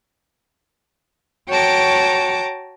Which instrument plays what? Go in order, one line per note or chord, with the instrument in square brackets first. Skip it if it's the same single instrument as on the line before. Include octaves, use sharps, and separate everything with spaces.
[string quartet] F#4 C#5 G5 A5 A#5 D6